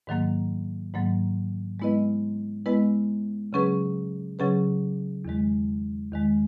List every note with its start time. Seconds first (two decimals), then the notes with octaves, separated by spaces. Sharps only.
0.07 G#2 D#3 F#3 A#3
0.93 G#2 D#3 F#3 A#3
1.80 G#3 B3 E4 B4 D#5
2.66 G#3 B3 E4 B4 D#5
3.53 C#3 F#3 C#4 G#4 B4
4.39 C#3 F#3 C#4 G#4 B4
5.25 E2 D#3 G#3
6.12 E2 D#3 G#3